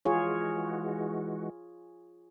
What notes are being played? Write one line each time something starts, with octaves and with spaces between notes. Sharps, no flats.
E3 G#3 F4 F#4 G#4 C#5